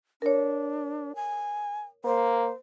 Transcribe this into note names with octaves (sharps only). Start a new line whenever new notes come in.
D4 A#4 C#5
G#5
A#3 C5